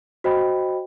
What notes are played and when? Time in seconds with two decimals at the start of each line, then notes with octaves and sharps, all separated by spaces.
0.24 F#4 C5 D#5 G5 B5